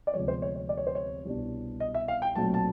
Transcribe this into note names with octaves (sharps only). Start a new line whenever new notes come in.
D5
D2 C3 F3 G#3 B3 C#5
C5
C#5
C#5
D5
C#5
C5
C#5
C2 B2 G3 B3 D4
D#5
E5
F5
G5
B1 A#2 F#3 A3 C4 A5
A5